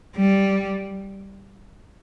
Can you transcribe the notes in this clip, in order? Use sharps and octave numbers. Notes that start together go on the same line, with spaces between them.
G3